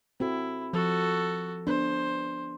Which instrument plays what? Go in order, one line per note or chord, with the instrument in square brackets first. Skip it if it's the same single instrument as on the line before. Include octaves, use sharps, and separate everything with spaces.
[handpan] C4 F#4 A4 [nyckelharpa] E4
[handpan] F3 [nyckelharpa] F#4 A4
[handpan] B3 D4 [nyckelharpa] C5